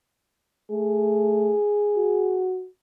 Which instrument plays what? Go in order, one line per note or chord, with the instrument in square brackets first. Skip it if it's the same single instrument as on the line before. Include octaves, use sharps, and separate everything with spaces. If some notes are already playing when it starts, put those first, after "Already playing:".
[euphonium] A3 [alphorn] G#4
[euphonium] F#4